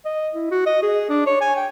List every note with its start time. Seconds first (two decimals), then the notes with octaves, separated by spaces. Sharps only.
0.05 D#5
0.35 E4
0.51 F#4
0.66 D#5
0.82 G#4
1.09 D4
1.26 C#5
1.41 G#5
1.56 G5